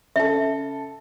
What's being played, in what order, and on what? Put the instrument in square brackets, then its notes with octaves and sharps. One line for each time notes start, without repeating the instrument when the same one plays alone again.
[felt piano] C#3 A4 [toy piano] E5